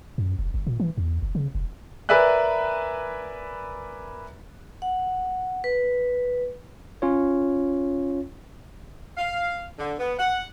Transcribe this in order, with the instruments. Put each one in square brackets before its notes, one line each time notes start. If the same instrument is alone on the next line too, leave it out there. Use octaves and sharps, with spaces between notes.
[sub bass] F#2
F1
G1
A#2
E3
E2
F#1
C#3
F1
[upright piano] A#4 B4 D5 E5 G#5 F#6
[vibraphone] F#5
B4
[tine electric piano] C#4 F4 C#5
[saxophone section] F5
D3
B3
F#5